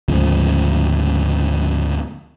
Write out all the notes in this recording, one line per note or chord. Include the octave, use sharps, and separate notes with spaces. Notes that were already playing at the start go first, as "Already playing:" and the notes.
D2 G#2 C#3 F3